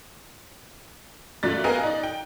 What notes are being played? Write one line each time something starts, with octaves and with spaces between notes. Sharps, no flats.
F#2 A#2 A3 D5 F#6 A6
B3 G4 A#4 D#5 F5 G#5
D#4 D5
G5